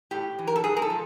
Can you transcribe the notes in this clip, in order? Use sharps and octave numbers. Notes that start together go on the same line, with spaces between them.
A2 G4
E3
A#4
A4
G#2 G#4
A#4
A4
F3